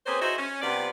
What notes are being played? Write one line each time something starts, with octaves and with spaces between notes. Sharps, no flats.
A#3 C4 C#4 G#4 B4 C5
D#4 F#4 G#4 C5 D#5 E5
C#4
G2 C3 B3 F4 B4 D5